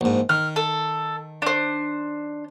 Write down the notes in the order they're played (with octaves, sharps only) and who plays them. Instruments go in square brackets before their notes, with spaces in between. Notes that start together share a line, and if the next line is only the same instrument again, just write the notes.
[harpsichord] A#1 G#2
[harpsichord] D#3 [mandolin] F6
[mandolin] A4
D4 C5